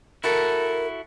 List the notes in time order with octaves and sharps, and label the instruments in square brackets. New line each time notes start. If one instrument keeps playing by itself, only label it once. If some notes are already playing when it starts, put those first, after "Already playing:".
[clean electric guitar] E4 F#4 A4 [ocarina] A#4